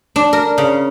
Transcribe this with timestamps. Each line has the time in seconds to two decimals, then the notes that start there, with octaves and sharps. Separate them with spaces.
0.16 D4
0.33 A#4
0.58 C#3